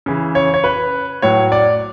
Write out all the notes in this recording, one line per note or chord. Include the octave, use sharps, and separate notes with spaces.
C#3 E3
C#5
C#5
B4
A2 F#3 C#5
D5